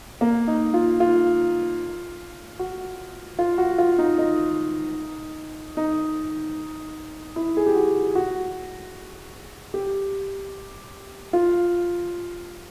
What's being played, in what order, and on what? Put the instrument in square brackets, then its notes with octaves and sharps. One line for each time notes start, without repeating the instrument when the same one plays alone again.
[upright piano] A#3
D#4
F4
F4
F#4
F4
F#4
F4
D#4
D#4
D#4
E4
G#4
G4
F#4
F#4
G4
F4